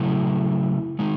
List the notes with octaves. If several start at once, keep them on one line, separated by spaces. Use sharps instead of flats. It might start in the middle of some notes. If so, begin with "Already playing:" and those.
Already playing: C#3 F#3 A3 E4
D#3 G#3 D#4